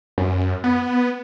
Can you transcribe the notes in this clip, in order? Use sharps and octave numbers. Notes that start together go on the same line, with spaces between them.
F#2
B3